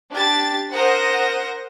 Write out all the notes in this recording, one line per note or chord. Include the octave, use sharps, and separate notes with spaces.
D4 G4 A5 A6
A#4 C5 F#5 D#6 A#6